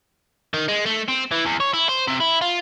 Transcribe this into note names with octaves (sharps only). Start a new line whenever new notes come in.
D#3
G#3
A3
C4
E3
E2
C#5
E4
C5
C3
E4
F4